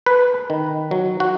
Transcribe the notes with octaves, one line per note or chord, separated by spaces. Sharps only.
B4
D#3
F#3
F#4